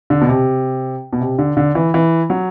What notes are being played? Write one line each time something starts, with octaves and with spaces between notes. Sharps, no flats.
D3
B2
C3
B2
C3
D3
D3
E3
E3
F#3